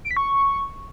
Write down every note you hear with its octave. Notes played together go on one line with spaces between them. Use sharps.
D7
B6
C#6